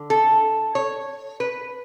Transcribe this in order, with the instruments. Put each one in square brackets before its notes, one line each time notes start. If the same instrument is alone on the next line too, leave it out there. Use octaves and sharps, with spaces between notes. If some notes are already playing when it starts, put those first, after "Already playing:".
Already playing: [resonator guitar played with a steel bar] D3
A4
C#5
B4